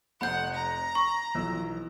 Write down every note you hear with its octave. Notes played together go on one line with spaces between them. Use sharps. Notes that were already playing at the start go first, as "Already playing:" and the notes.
F1 F2 F#5 B5 G6
A#5
B5 C#6
B1 E3 F3 E6